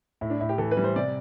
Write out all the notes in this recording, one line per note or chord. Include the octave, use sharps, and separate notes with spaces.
A2 E4
D4
A2 E4
G4
E3 A4
B4
G3
C5
C3 D5